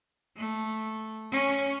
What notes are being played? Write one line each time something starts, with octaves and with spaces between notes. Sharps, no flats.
A3
C#4